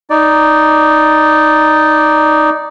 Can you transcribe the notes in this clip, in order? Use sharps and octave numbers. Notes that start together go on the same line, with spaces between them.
D#4 D5